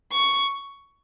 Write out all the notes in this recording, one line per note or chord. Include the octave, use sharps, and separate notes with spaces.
C#6